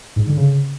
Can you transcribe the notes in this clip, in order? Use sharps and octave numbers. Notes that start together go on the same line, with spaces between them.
G#2
D3
C#3